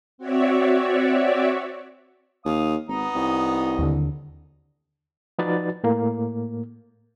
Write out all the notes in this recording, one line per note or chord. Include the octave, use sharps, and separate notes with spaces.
C4 F#4 C#5 D5 E5
D#2 F5 D#6
G#1 B3 D#4 D#5
C2
D#2 D3
F3 D#4 F#4 B4 D5 A6
A2 A#3